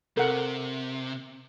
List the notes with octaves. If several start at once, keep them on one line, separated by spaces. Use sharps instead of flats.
C3 A4 A#4 F#5